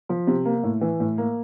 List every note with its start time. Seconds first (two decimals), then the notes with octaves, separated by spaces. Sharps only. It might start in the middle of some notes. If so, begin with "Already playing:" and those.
0.09 F3
0.27 C3
0.45 A#3
0.63 A2
0.81 E3
1.00 A2
1.18 A#3